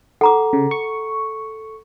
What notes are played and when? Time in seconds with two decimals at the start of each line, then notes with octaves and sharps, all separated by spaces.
0.21 A4 F#5 A#5 D6
0.53 C#3
0.71 C#6